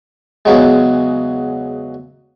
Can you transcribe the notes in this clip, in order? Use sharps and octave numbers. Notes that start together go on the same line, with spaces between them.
E2 C#3 F#3 G#3